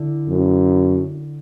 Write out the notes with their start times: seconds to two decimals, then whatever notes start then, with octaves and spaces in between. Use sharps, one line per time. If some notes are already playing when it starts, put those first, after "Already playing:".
Already playing: D3 E4
0.28 F#2